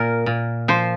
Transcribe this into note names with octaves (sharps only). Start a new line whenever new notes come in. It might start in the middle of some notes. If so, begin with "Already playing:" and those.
Already playing: A#2 A#4
A#2
F3 C5